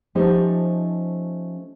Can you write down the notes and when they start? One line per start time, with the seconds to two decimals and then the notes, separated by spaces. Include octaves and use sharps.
0.15 F3 A3 C#4 D#4 G4 C5